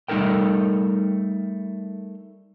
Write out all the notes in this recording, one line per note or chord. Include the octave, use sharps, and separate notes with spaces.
G3 A3 D#4 A4 A#4 G5